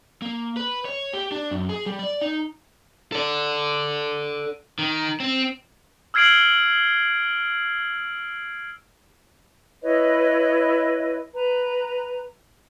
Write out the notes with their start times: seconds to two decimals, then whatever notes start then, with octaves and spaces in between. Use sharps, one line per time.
0.22 A#3
0.57 B4
0.85 C#5
1.13 G4
1.32 D4
1.51 F#2
1.69 G#4
1.86 G3
1.99 D5
2.21 D#4
3.12 A4 D5
4.79 D#3
5.20 C4
6.14 E6 F6 G#6 C7 D7 F#7
9.82 E4 B4 C#5 D#5
11.35 B4 A#5